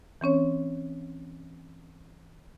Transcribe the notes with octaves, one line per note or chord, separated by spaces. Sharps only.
E3 C4 C#4 C#5